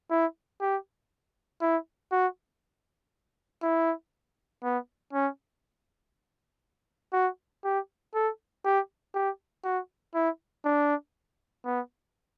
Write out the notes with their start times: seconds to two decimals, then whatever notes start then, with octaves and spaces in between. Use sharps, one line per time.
0.11 E4
0.61 G4
1.62 E4
2.12 F#4
3.63 E4
4.63 B3
5.13 C#4
7.13 F#4
7.64 G4
8.15 A4
8.65 G4
9.15 G4
9.64 F#4
10.15 E4
10.65 D4
11.65 B3